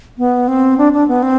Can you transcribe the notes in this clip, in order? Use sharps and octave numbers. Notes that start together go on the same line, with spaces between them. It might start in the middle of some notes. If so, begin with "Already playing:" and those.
B3
C4
D4
D4
B3
C4